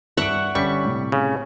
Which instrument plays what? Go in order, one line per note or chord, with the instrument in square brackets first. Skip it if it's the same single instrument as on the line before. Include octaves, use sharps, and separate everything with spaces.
[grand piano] G2 D7 [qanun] E5 F#5 C#6
[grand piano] G1 C#4 B6 [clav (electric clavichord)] G3 [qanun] C#6
[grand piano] A2 C3
[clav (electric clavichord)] C#3